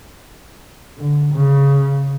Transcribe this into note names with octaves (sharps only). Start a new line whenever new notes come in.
D3
C#3